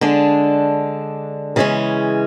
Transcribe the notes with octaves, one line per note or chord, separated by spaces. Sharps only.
D3 G#3 D4
C#3 E3 G#3 C#4